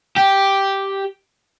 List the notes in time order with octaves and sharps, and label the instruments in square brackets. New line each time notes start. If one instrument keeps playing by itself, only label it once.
[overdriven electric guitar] G4